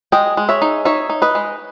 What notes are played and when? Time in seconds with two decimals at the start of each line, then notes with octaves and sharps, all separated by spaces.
0.12 G#3 D#5 G5
0.37 G#3
0.49 C#5 E5
0.62 D#4
0.85 D#4 C#5 E5
1.10 D#4
1.22 B4 D#5
1.35 G#3